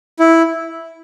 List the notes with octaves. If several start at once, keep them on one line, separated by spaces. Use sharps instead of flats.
E4